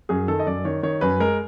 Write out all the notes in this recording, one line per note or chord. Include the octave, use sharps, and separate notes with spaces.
F#2 G#4
D#3 A4
D#5
F#2 D5
D#3 C#5
D#3 C#5
F#2 B4
G#3 A#4